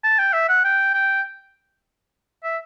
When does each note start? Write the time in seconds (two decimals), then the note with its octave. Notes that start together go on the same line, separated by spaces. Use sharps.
0.03 A5
0.19 G5
0.33 E5
0.49 F#5
0.64 G5
0.94 G5
2.44 E5